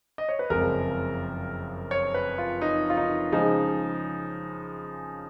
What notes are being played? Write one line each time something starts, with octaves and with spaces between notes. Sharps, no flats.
D#5
C#5
B4
F#1 F2 F3 G#3 A#4
C#5
B4
F4
D#4
F4
D#4
C#3 F3 G#3 D#4